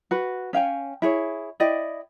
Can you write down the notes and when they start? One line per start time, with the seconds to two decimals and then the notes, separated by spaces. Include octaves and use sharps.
0.11 F#4 B4
0.53 C#4 F5 G5 G#5
1.02 E4 G#4 C#5
1.60 E4 D5 D#5 G5